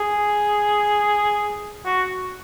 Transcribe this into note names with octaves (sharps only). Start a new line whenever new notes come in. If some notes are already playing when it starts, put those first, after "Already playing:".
Already playing: G#4
F#4